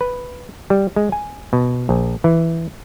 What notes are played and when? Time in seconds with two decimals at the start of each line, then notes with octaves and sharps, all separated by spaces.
0.01 B4
0.70 G3
0.96 G#3
1.12 G#5
1.53 B2
1.89 A#1
2.24 E3